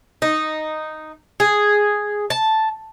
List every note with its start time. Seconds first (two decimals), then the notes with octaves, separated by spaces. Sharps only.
0.22 D#4
1.40 G#4
2.30 A5